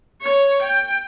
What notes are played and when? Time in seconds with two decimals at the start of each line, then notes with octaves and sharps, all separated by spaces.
0.22 C#5
0.62 G5